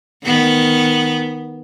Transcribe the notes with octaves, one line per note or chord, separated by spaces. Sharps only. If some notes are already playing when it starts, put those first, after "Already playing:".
D#3 B3